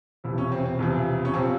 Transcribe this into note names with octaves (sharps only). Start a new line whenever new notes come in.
E1 E2 C3 F3 E4
C#4
C4
C4
E1 E2 C3 F3
C#4
C3 F3 C4